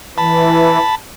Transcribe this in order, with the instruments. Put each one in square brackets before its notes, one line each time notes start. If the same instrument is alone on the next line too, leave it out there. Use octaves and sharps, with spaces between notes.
[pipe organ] E3 [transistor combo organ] A5 B5